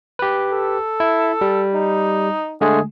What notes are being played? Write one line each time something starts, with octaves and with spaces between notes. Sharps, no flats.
G4 B4
A4
E4
G3
D#4
D3 G#3 A3 G#4